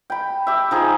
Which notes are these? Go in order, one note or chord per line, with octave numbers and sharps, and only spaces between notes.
G5 B5
G4 E5
F3 D#4 G#4